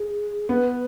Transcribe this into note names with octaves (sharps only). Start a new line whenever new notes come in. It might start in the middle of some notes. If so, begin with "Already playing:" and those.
Already playing: G#4
B3 B4